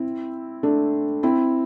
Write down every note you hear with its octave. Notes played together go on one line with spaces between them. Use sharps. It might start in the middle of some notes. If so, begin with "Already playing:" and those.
Already playing: C4 E4
A3 D4
C4 E4